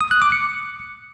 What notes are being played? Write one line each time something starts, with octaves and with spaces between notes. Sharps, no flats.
D#6
F#6
D6
C#7